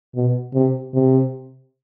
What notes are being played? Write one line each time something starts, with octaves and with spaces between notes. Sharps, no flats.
B2
C3
C3